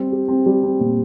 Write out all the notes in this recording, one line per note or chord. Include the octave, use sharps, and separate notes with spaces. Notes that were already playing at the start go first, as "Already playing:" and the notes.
Already playing: G3 C4
G4
C4
G3
C4
A#2